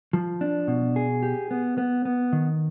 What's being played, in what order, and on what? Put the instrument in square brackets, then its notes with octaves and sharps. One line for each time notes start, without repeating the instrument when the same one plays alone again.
[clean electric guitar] F3
D4
B2
G#4
G4
B3
B3
B3
D#3